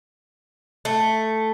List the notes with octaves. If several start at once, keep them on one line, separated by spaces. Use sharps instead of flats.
A3